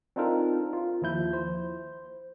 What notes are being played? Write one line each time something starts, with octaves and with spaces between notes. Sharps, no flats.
C4 D4 D#4 F4 A4 A#4
F4
D#2 F3 E4 G6
C5